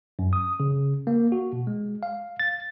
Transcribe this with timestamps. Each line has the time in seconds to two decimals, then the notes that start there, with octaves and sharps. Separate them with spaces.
0.19 F#2
0.33 D#6
0.60 C#3
1.07 A#3
1.32 F#4
1.53 B2
1.67 G#3
2.03 F5
2.40 A6